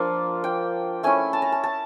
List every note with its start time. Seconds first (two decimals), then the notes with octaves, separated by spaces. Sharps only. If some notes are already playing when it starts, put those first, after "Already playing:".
Already playing: F3 A#3 D4
0.44 G5
1.03 A3 C#4 E4 G#5
1.33 A5
1.42 A#5
1.52 A5
1.64 A5